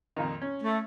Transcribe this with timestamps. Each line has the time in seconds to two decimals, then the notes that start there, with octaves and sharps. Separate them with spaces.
0.16 F2 A#2 D#3
0.42 C#4
0.63 A3